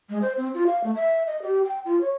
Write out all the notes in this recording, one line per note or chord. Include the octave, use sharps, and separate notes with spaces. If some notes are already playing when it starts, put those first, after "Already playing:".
G#3
C5
C4
F4
F5
A3
E5
D#5
G4
G5
F4
C#5